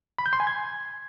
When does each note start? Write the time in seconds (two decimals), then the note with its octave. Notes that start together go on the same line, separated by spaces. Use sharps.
0.19 B5
0.26 G6
0.33 C6
0.40 G#5
0.47 G#6